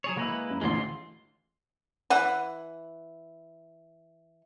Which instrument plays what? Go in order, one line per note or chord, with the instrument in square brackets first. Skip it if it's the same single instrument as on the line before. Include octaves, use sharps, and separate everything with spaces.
[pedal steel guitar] F#3 G#4 C#5
[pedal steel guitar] G#3 B4 [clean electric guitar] A#3 E4
[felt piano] F#2
[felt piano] A1 D2 E3 [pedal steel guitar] G#3 F4 C6
[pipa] E3 F#5